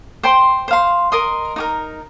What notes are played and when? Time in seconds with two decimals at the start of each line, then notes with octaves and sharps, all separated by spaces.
0.23 C5 G5 C6
0.68 C5 F5 C6
1.12 A#4 D#5 C6 D#6
1.56 D#4 G4 A#4